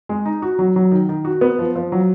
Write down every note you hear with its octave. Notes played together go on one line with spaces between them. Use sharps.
G#3
D#4
F#4
F#3
F#3
D#3
D#3
F#4
B3
F3
F3
F#3